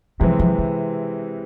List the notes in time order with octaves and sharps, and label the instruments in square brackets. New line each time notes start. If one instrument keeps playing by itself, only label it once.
[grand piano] C3 E3 G#3 C4 [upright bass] F3
[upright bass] F3
D3